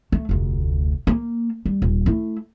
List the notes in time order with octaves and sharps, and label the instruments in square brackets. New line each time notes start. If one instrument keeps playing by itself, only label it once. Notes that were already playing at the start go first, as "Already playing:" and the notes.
[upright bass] A3
F1 D2
A#3
G3
D#1
A3 E4